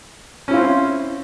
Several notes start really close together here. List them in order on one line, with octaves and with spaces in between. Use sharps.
C#4 E4 F4 C4